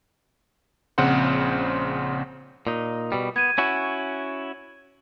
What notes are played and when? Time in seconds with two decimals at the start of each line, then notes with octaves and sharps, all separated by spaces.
0.98 A#1 C#3 C4 C5 F#5 C6
2.67 A#2 D#4
3.12 B2 G3
3.36 B3 G#6 D#7
3.58 C#4 E4 F#4